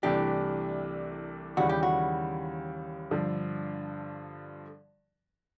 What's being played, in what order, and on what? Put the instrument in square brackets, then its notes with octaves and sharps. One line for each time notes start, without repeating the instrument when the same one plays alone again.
[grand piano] C2 C3 E3 A3 D4 [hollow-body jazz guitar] G4
[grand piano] D#2 C#3 E3 G3 [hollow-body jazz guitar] F#4
[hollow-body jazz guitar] G4
F#4
[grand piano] G2 D3 F3